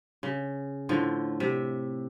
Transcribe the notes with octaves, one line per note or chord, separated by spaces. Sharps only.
C#3
A2 D3 F3
C3 E5